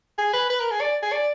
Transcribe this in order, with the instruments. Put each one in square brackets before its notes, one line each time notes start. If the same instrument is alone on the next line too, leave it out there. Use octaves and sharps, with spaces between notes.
[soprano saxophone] G#4
B4
B4
A#4
G#4
D5
G#4
D5